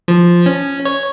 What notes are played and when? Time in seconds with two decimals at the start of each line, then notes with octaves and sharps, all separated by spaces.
0.08 F3
0.46 C#4
0.85 C#5